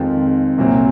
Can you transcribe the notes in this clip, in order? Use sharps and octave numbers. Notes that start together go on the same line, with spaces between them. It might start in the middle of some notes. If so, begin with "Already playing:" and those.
Already playing: F2 D#3 G#3 C4 F4
C2 A#2 F#3 C4